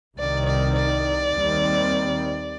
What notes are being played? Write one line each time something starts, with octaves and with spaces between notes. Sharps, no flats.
C2 C3 D#3 D5
D5
D5
D#2 D#3 G3 C4